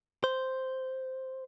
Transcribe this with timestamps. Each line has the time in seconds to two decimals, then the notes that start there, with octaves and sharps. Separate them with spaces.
0.24 C5